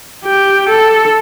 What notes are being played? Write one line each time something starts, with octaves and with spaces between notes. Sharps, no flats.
G4
A4